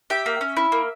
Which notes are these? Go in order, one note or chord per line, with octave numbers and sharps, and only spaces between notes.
G4 E5
A#3
C#4
E4
A#3